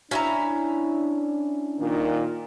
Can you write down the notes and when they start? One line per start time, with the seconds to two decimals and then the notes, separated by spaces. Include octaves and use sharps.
0.11 C#4 D4 E4 A#5
1.80 A#2 D#3